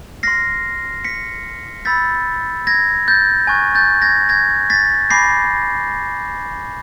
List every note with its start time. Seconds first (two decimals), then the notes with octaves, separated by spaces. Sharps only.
0.23 C6 F6 A#6 C7
1.04 B6 C#7
1.85 B5 E6 G6 A6 B6
2.67 G#6 A#6
3.08 G6 A6
3.47 G#5 C#6 F#6 G#6
3.75 G6 A6
4.02 G#6 A#6
4.29 G#6 A#6
4.70 A6 B6
5.10 G#5 B5 D6 G6 A#6 C7